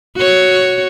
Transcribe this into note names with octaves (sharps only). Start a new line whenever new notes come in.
F#4 C#5